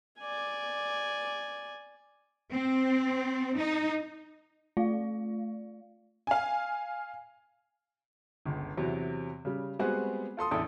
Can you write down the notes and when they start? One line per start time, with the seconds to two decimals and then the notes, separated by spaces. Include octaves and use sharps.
0.21 D5 G#5
2.52 C4
3.57 D#4
4.77 A3 F4 D5 F5
6.27 F5 G#5
8.46 G1 C#2
8.77 E2 C3 F#3
9.45 C#3 G3
9.79 G3 G#3 B3 C4 F#4 G#4
10.37 F4 A4 C6 D#6
10.51 A1 E2 D4 E4 A4 D#6